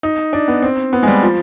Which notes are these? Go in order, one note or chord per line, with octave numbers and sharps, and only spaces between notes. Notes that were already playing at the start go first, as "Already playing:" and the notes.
D#4
D4
B3
C4
B3
G#3
G3
F3